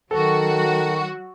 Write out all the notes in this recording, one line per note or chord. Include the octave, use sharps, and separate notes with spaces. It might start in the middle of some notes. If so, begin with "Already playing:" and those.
D#3 F#3 F#4 A4